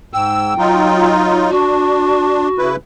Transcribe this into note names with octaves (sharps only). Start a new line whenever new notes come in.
G#2 G5 E6
F#3 D#4 F4
D4 F#4
C#3 E4 B4